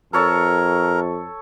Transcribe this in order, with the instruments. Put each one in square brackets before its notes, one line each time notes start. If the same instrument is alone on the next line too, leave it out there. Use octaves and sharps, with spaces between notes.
[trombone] F2 [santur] A4 C#5 A5 [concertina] A#4